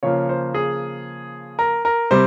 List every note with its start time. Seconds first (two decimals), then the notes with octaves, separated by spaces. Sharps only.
0.03 C#3 F3 A#3 C#5
0.29 C5
0.54 G#4
1.59 A#4
1.85 A#4
2.11 C3 G3 C5